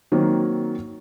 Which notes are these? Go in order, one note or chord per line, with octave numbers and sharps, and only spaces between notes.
D#3 F#3 A#3 C4